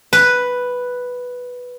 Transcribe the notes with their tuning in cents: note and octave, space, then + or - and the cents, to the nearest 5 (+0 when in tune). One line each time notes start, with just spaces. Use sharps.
B4 +0